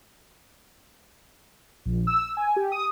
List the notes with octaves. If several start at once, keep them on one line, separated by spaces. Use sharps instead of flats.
A#1
E6
G#5
G4
D#6